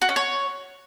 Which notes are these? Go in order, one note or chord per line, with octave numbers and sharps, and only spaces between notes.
F#4
C#4
C#5